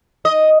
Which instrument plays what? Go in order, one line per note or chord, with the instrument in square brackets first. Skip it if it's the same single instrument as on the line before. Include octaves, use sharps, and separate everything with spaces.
[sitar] D#5